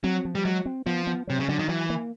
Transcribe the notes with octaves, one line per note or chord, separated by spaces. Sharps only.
F#3 C4
F3
G3
F#3 G#3
C4
F3 B3
B3
C3 F#3
C#3
D3 F#3
D#3
E3 F#3
A#3